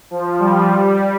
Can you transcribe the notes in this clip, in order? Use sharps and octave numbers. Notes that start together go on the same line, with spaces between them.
F3
G3
G3